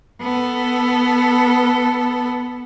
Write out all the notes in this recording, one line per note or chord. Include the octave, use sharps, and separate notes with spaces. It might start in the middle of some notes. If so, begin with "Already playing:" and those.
B3 A4